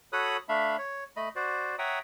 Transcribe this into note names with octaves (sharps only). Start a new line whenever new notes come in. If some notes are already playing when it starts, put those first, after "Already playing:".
F#4 A4 C#5 B5 D#6 F#6
A3 D4 E5 F5 B5
C#5
A3 D#5 B5
F#4 C5 D5
C#5 E5 F#5 G5 A#5 D#6